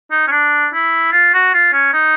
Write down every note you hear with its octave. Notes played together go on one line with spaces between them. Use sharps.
D#4
C#4
D4
E4
F4
F#4
F4
C#4
D#4